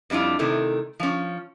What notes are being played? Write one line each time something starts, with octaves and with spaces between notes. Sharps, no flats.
F2 G3 D4 E4 F4
C3 D#3 A3 E4
F3 C#4